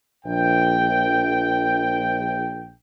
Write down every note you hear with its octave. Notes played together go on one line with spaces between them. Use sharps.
A#1 G5